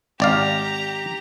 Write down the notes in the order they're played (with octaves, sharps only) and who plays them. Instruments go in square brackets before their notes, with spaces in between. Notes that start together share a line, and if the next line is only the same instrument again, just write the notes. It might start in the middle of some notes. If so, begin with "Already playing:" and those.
[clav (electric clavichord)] G#1 D5 F5 [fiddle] G4 A#5